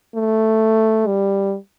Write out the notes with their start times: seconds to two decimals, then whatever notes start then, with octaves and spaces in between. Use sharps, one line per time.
0.15 A3
1.07 G3